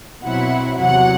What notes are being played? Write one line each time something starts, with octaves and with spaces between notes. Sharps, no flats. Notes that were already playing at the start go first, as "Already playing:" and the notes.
B2 F#3 C4 E4 F#5
E2 C3 F#3 F#5